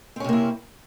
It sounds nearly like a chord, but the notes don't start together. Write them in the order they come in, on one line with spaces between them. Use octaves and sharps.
C4 C#4 C3 A#3 E4